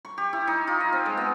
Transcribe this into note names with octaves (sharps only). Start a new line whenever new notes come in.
C#6
G4
E4
D#4
F4
D#5
C4
G#3
B3